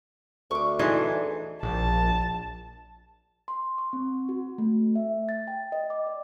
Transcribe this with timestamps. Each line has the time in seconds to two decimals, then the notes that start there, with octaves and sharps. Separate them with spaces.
0.51 D2 C#6 D6
0.79 E3 D4 D#4 G#4 C6 D#6
1.63 A#1 A5
3.48 C6
3.78 C#6
3.93 C4
4.29 F#4
4.58 A3
4.95 E5
5.29 A6
5.48 G5
5.72 D#5
5.90 D6
6.07 D5